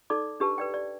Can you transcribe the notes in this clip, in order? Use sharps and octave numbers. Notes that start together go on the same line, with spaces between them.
D#4 A4 D5 D6
D4 G4 B4 A5
B4 D5 G5
D5